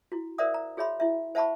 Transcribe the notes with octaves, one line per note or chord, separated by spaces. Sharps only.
E4 F#4
A#4 C5 D5 E5 F#5 D#6
A#5
F#4 G#4 C#5 E5 B5 C6
E4 E5
C5 E5 F#5 A5 B5 C#6